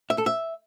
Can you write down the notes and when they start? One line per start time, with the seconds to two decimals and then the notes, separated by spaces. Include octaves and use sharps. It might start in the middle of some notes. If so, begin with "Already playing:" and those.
0.10 E5
0.18 A4
0.26 E5